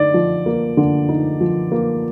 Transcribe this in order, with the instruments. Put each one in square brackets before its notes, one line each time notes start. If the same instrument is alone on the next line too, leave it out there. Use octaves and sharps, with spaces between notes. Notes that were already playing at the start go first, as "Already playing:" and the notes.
Already playing: [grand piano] D3 D#4 [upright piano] D5
[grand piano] F3
A#3
D3
D#4
F3
A#3